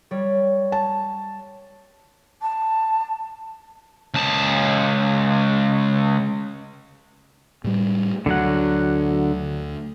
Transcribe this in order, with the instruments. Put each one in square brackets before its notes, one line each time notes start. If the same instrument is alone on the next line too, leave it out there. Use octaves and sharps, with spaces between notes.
[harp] G3 C#5
[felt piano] A5
[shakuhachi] A5
[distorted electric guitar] C#2 A5
[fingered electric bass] A2 G3
[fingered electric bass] D2 [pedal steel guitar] D3 F#3 F#5